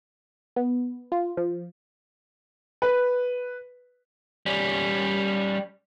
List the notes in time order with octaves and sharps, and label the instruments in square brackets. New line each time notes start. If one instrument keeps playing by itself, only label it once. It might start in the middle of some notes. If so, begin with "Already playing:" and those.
[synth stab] B3
F4
F3
[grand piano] B4
[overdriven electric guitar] G3 C#4